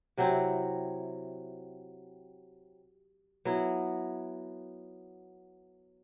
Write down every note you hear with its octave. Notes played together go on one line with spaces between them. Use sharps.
C3 F#3 C4 E4
F#3 B3 E4